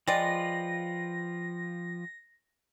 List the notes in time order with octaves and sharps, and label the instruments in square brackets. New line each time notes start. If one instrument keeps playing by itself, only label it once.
[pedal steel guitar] F3 F4 B4 [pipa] G#3 D5 [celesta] G5 [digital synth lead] A#6